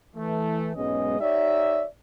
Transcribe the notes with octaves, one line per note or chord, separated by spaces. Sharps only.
E3 A3
B1 G#2 G#3 B3 C#4 D#5
D#4 G4 C#5 D5 E5